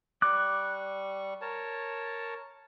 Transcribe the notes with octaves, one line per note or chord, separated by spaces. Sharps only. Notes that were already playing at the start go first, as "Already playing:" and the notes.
G3 C#6 D6 F#6
A#4 C#5 A5